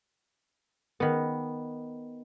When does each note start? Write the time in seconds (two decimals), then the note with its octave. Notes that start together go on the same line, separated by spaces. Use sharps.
1.00 D#3 B3